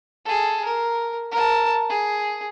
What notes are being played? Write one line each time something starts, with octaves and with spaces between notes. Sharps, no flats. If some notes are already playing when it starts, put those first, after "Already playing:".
G#4 A4
A#4
A#4 A5
G#4